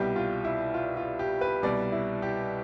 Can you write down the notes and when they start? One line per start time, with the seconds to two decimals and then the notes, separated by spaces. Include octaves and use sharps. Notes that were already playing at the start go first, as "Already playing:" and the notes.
Already playing: C2 B2 G3 G4
0.16 F4
0.44 E4
0.74 F4
0.97 F4
1.19 G4
1.41 B4
1.62 C2 B2 G3 D5
1.92 E4
2.22 G4